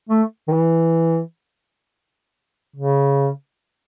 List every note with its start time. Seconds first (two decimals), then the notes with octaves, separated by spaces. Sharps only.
0.09 A3
0.48 D#3
0.53 E3
2.76 C#3